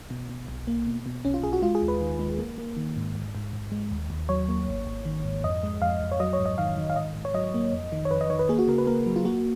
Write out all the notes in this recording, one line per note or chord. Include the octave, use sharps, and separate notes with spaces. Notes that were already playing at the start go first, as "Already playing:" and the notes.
B2
B2
B1
A#3
B2
B2
B1 C#4
F4
B1 G#4
F#4
G#3 F4
G#4
D#2
B4
D#3
G#3
A#3
A#3
D#3
G#2
G#2
G#2
G#2
G#3
D#2
D#2
F#3 C#5
A#3
G#1
G#1
D#3
G#2
F2 D#5
G#3
F2 F5
F2
C#5
F#3 D#5
C#5
G#2
D#5
D#3 F5
D#3
F5
G#2 D#5
G#2
C#5
F#3 D#5
A#3
F2
D#3
C#5
F2 B4
D#5
D#3 C#5
B4
A#3 G#4
F#4
C#3 A#4
B4
A#3 A#4
F#3
F4
A#3 F#4